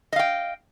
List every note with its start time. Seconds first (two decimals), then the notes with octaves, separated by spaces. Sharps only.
0.13 D#5
0.16 F5
0.19 G5